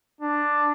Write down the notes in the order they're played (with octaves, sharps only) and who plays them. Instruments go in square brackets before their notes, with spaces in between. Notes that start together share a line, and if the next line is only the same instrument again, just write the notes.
[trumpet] D4